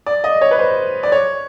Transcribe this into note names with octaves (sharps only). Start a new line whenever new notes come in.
D5
D#5
C#5
B4
C5
D5
C#5